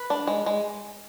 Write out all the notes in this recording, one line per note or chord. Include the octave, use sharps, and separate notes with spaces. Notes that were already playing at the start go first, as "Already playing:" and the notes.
Already playing: B4
D4
G#3
G#3